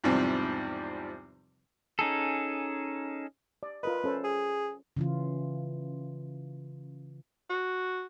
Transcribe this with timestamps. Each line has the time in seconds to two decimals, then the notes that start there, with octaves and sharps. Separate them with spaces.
0.04 E2 G#2 C3 F3 G3 C4
1.99 C#4 D#4 G#4 A4
3.63 D5
3.83 F4 A#4 B4 D#5
4.04 C#4 A4 C5
4.24 G#4
4.97 C#3 E3 F4
7.50 F#4